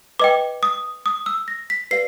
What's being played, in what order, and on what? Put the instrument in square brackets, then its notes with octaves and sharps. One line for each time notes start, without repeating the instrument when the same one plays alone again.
[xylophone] B4 D#5 G5 D6
D#6
D#6
E6
A#6
B6
G4 B4 D5 F5 C7